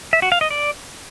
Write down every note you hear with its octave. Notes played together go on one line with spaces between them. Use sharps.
E5
F#4
F5
D#5
D5